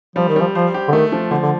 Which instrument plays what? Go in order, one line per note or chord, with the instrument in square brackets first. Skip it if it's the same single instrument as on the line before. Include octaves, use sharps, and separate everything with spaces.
[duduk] F3 [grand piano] G3
[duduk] D#3
[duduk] F3 [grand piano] G3
[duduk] F3 [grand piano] C5
[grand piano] G4
[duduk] D3
[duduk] D#3 [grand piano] A3
[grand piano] F3
[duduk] D3 [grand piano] F3
[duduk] D3